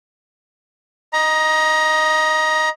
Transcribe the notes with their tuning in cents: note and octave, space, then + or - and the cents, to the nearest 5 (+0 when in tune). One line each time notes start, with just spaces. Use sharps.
D#5 +0 A#5 +20